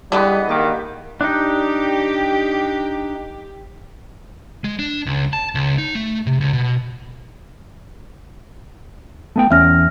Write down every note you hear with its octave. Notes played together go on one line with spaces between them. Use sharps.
D3 E3 G3 G#3 B3 B4 D#5
D#3 A#3 G4 D6
D4 D#4 G4
G#3
D4
C#2
A5
C#2
D#4
A3
C3
C#2
B2
A3 B3 G5
E2 C#4 E5 F6 A#6